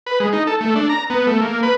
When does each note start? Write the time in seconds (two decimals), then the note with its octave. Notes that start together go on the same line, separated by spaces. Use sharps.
0.07 B4
0.20 G#3
0.33 D#4
0.47 A4
0.61 A3
0.76 D4
0.89 A#5
1.10 B3
1.27 A3
1.41 A#3
1.63 B4